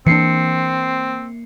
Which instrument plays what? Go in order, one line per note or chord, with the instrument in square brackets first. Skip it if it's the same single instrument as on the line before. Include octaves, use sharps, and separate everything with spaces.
[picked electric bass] E3 D4 [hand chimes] A#3 C7 C#7 [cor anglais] C4